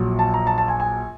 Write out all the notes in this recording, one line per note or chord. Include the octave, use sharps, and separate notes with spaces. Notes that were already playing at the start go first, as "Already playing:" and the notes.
Already playing: A#1 A#2 F#3
A5
A#5
A5
A5
G#5
G#5